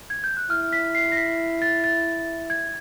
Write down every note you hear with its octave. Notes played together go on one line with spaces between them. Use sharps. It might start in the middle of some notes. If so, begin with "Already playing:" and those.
G#6
G6
F#6
E4 F6
B6
C7
A#6
B6
A6
A6
G#6